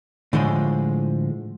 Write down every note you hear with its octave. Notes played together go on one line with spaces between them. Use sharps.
A2 D3 F3 G#3